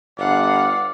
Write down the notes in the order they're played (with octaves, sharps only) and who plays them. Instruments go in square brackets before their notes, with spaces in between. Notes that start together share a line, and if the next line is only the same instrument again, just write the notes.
[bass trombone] G1 [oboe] D5 [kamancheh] F5 F#5